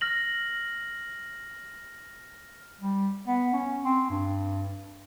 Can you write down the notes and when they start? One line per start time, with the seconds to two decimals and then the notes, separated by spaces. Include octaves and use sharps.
0.01 F6 A#6 F#7
2.80 G3
3.27 B3
3.53 C#4
3.84 C4
4.09 G2